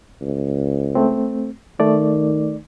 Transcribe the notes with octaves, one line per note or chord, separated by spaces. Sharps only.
C#2
A3 C4
D#3 A3 D5